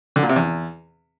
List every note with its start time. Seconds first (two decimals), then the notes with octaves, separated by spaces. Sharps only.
0.16 D3
0.23 A#2
0.29 C3
0.36 E2